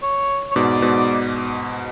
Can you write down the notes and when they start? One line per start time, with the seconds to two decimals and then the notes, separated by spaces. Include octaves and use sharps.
0.03 C#5
0.51 C#5
0.55 G#2 B2 D5
0.82 G#2 B2